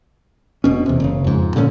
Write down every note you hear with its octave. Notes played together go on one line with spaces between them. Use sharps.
F1 B2 C#4
E2 C3
F#1 C#3
F2 G#2
A#2 D3 F#3 C#4